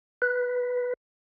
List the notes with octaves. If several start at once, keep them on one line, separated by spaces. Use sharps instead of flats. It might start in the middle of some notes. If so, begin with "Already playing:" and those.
B4